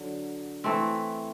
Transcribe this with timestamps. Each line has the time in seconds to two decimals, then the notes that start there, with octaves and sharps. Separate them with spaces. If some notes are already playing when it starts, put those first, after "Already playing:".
Already playing: D3 F#3
0.64 E3 A3 C4